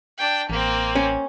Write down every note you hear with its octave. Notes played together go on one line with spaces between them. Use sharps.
D4 G5
A1 A#3 C4
C#4